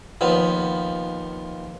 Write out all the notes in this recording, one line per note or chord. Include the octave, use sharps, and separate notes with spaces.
D#2 F3 B3